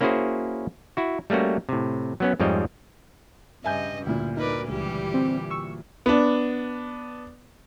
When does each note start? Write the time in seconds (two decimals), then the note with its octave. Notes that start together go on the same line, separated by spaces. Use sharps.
0.01 A#3 C#4 E4 F#4 G#4 C5
0.97 E4 F#4
1.30 G3 A3 A#3 C#4 F#4
1.69 A2 C3
2.20 F#3 B3 C#4
2.40 F2 G#2 G3 C4 C#5 D#5
3.64 G2 C#3 D#5 E5 G#5 G6
4.06 D2 A#2 E4
4.37 D#4 A#4 B4 D5
4.68 C#2 E3 G3 G4
5.14 C4
5.50 C#6 E6
6.06 B3 D4